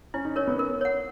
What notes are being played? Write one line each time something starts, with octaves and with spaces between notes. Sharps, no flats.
C#4 E4
D#4
C#4 A#4 C#5
B3
A#4
C#5 F#5